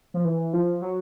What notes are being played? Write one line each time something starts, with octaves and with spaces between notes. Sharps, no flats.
F3
E3
F3
F#3